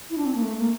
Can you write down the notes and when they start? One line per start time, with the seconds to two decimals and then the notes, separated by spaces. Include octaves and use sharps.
0.10 E4
0.18 D4
0.25 C4
0.35 A#3
0.42 A3
0.58 A#3